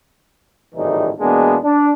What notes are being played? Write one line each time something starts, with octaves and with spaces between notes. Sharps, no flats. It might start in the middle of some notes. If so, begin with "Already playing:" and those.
G#1 C#2 A2 E3 G3 D#4
E2 B2 G#3 A#3 B3 D4
D4